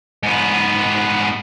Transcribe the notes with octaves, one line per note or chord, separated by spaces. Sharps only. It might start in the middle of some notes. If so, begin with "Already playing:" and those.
G#2 B3